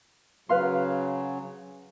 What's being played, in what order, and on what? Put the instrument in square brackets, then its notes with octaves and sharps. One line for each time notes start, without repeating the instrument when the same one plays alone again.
[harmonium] C#3 F#3 [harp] B4 F5 C6